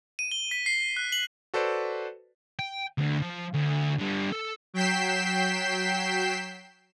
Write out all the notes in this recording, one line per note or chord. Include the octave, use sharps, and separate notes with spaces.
D#7
G7
B6
C7
F#6
F#7
F#4 A4 B4 C5 D5
G5
D2 D3
F3
D2
D3 G3
A4
F#3 G5 G6 B6 C7 E7